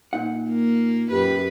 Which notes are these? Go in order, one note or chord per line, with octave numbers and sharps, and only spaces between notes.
A#2 D#4 F#5
A#3
F#2 G4 B4